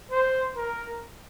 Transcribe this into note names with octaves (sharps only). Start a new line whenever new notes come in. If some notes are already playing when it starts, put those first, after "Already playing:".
C5
A#4